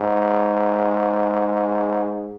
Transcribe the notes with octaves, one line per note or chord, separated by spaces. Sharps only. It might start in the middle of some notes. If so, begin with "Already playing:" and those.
Already playing: G#2